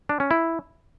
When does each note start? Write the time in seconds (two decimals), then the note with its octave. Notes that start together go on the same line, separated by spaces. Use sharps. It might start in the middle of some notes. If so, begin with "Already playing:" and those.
0.09 D4
0.20 C#4
0.31 E4